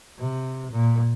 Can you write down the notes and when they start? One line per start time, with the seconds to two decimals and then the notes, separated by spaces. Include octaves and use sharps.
0.19 C3
0.72 A#2